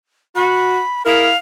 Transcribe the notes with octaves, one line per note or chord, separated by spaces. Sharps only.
F#4 B5
E4 G#4 A#4 F5